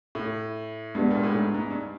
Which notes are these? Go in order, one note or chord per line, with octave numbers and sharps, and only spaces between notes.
A2
G2 G#3 B3 D4 G4 B4
A#2
A2
G#2
G#2
G2